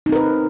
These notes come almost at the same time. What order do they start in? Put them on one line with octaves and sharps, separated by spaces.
D#4 C4 A#4 B4